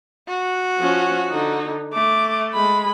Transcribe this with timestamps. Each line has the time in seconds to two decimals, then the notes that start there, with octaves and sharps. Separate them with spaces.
0.28 F#4
0.79 F3 C#4
1.31 D3 D#4
1.93 A3 D6
2.53 G#3 B5